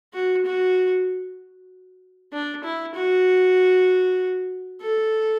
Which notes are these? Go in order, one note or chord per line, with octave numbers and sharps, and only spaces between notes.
F#4
F#4
D4
E4
F#4
A4